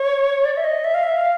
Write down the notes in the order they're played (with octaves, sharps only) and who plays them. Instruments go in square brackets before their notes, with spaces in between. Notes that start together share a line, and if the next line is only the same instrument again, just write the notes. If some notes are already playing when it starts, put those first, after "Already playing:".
Already playing: [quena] C#5
D5
E5
D#5
E5
F5
E5
F5